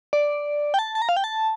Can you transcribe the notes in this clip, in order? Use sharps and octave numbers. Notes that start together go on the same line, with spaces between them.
D5
G5
A5
A5
A#5
F5
G5
A5